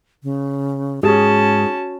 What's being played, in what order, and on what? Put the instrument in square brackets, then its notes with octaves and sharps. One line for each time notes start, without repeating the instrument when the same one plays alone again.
[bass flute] C#3
[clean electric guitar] G#2 [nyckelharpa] C#4 A5 [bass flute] F#4 [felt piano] G#4